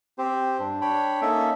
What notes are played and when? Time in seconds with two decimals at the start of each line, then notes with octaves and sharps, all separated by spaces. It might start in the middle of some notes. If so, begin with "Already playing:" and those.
0.18 C4 G4 C5
0.59 G2 D4
0.81 D4 C#5 G5 B5
1.22 A#3 C#4 D#4 A4 E5